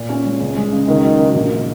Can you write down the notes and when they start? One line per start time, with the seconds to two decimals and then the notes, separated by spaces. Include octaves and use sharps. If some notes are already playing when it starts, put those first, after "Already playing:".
Already playing: A#2
0.09 C#4
0.25 G#3
0.41 C#2
0.56 G#3
0.72 C#3
0.88 C#2 D#3
1.04 F#3
1.19 C#3
1.35 A#1
1.50 A#3